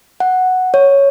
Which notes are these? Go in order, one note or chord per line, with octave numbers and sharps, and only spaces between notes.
F#5
C#5